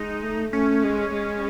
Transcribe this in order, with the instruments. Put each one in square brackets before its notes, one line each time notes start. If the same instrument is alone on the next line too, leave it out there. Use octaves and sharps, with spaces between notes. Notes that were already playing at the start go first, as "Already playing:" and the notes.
Already playing: [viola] G#3 [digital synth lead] D#4
[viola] A3
[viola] A3 [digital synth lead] C#4
[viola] G#3
G#3